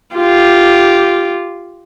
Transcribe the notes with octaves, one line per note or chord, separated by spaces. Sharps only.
F4 G4